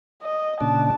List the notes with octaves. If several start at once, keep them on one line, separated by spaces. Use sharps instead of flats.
D#5
A#2 C#3 D4 A5